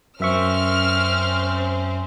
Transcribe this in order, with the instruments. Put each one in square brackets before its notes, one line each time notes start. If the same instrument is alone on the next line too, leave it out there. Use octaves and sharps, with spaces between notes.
[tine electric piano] F#2 E5 C#6 [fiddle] C4 C#4 [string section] F6